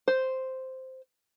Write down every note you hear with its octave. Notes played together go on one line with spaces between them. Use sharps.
C5